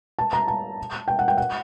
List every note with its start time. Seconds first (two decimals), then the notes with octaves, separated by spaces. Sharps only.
0.19 A5
0.33 A#5
0.48 A5
1.08 G5
1.19 F#5
1.28 G5
1.37 F#5